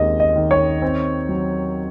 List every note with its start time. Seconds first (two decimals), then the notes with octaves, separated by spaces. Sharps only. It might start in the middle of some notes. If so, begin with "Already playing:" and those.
Already playing: D#2 G#3 C4 D#5
0.20 D#5
0.36 D#3
0.51 C#5
0.82 C4
1.29 F#3